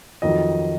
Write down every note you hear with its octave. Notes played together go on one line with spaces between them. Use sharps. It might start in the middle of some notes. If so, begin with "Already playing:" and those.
F2 D#3 F#3 D#5